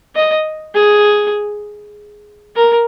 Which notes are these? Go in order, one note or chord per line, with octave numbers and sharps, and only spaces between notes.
D#5
G#4
A#4